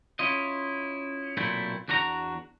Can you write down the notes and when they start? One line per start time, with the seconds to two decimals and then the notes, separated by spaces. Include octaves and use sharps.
0.19 C#4 E4 F4 D#5
1.37 B1 A#2 A3 C4 E4
1.88 E2 D4 F#4 A#4 A#5